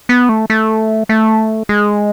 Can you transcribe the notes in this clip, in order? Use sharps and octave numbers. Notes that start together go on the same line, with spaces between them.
B3
A3
A3
A3
G#3